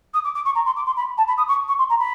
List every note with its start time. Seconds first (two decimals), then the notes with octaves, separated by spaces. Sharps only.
0.14 D#6
0.24 D6
0.34 D6
0.45 C#6
0.55 A#5
0.66 C6
0.76 D6
0.86 C6
0.96 B5
1.17 A5
1.27 B5
1.37 D#6
1.48 C#6
1.68 C#6
1.78 C6
1.89 A#5
1.99 B5